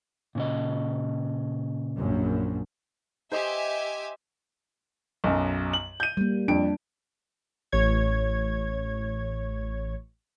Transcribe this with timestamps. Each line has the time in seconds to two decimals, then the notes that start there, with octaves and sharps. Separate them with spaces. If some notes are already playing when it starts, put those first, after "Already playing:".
0.35 A#2 C#3 D#5
1.95 A#1 F#2
3.32 G4 C5 D#5 E5 G#5 D#6
5.24 B1 F#2
5.73 F#7
6.00 G6 D#7
6.17 G3 A#3
6.48 F2 D4 D7
7.72 A1 C#5 G#6